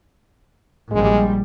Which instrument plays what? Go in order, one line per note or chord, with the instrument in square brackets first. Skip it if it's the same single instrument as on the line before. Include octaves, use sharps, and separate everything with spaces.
[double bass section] A#1 G3 [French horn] G#3